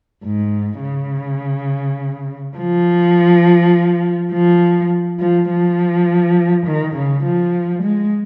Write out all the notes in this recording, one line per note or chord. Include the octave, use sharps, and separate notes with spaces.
G#2
C#3
F3
F3
F3
F3
D#3
C#3
F3
G#3